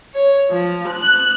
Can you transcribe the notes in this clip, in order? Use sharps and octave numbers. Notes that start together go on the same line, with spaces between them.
C#5
F3
F#6